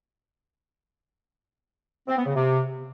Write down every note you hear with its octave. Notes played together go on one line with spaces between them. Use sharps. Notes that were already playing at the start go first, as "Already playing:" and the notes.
C4
B3
C#3
C3